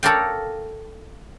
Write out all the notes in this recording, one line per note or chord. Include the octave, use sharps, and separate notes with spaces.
A4 A#4 C#5 D5 F5 G5